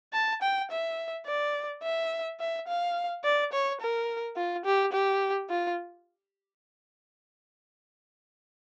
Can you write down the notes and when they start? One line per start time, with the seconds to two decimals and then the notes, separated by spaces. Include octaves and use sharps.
0.13 A5
0.42 G5
0.71 E5
1.26 D5
1.83 E5
2.40 E5
2.68 F5
3.24 D5
3.53 C#5
3.81 A#4
4.36 F4
4.65 G4
4.93 G4
5.50 F4